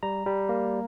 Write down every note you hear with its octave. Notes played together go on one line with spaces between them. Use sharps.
G3 A#5
G3
A#3